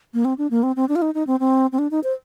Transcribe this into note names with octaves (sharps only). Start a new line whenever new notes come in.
A#3
C4
D4
A#3
C4
C4
D4
F4
D#4
D#4
C4
C4
C4
D4
D#4
C5